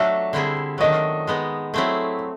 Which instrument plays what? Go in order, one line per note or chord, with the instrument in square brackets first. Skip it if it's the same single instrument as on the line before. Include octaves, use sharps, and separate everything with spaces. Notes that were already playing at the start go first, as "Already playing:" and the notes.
Already playing: [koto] F#3 A3 D4 F#4 A4 [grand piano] E5
[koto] D3 G3 C4 E4 G#4
[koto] D#3 F#3 A3 D4 [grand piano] D#5
[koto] G#3 B3 D#4
F#3 A3 C4 E4 G#4